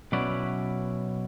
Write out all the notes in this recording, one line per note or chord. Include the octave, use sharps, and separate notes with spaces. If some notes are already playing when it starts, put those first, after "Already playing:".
B2 F#3 C#4 E4 B4 D5